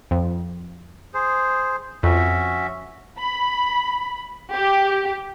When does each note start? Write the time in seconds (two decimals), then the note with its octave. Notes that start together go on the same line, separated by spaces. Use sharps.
0.11 F2
1.14 G#4 C5
2.03 F2 C#4 F#4 E5
3.18 B5
4.53 G4